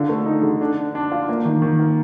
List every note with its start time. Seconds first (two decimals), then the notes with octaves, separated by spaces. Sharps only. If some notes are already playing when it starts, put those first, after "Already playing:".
Already playing: D3 F4
0.09 A3
0.26 D#4
0.43 D3
0.61 D4
0.77 D4
0.95 D4
1.12 F4
1.29 A#3
1.45 D#3
1.62 D#3
1.79 A#3